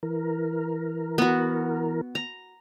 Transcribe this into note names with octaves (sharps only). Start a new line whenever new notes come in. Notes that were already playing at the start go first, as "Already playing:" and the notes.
E3 A#4
B3 F#4
A#5